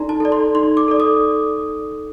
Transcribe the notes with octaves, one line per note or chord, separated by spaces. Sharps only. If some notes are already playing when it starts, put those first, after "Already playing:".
Already playing: D#4 A4 D5 A#5 C6
A5
A4 D5
C6
D#4 C6
D6
A4 D5
D#6